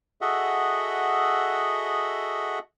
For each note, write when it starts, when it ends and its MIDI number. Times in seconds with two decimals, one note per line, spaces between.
0.21 2.59 66
0.21 2.59 68
0.21 2.59 69
0.21 2.59 75
0.21 2.59 76
0.21 2.59 78